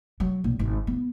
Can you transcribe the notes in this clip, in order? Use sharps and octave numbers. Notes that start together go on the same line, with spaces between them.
F#3
A#1
G#1
B3